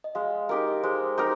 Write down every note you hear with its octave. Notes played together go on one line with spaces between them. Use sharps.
D#5
G#3 F5
D#4 G4 A#4 D#5
G#3 C5
D#4 G4 A#4 C5